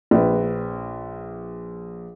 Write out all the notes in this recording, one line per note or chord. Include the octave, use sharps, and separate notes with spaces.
A#1 B4